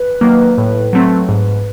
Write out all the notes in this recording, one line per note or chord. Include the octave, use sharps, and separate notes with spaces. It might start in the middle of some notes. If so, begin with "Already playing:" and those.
Already playing: B4
D#3 F#3 A#3
A2
F#3 A3 C4
G#2